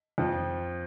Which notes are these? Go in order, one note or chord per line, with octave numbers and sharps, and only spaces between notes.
F2 F3